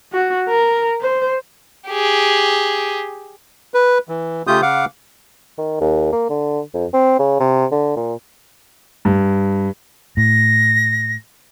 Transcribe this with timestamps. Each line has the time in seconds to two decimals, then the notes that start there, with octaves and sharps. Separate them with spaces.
0.12 F#4
0.49 A#4
1.00 C5
1.89 G4 G#4
3.74 B4
4.09 E3
4.47 C#3 A3 F4 G4 D#6 G6
4.62 C#3 F5 F#5 D6
5.58 D#3
5.81 D#2
6.13 A#3
6.30 D3
6.74 F2
6.93 C4
7.19 C#3
7.40 C3
7.71 D3
7.96 A#2
9.05 G2
10.17 A2 A#6